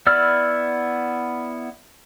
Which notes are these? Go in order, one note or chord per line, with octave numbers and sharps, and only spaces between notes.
B3 E4 D5 E6 F6